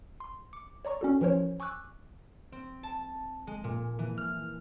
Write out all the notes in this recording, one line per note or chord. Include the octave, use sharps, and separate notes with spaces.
C6
D6 C#7
C#5 D5 A#5 C#6
C#4 F#4 A4
E3 F3 C#4 A#4 C5 C#5
G#5 C#6 D6 E6 F#6
C4
A5
G#3
A#2
E3
F6